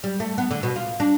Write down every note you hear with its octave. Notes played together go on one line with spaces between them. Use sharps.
G3
A3
B3
D3
B2
F4
D4